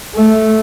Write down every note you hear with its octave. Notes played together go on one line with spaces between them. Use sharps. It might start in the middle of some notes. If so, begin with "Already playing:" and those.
A3